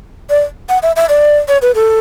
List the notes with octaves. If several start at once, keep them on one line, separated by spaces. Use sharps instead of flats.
D5
F#5
E5
E5
D5
C#5
B4
A4